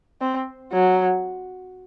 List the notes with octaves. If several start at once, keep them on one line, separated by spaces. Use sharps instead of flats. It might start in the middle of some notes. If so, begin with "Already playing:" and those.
C4
F#3